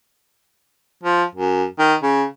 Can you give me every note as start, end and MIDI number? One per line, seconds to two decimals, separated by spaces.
1.03 1.23 53
1.35 1.64 42
1.79 1.95 51
2.02 2.24 49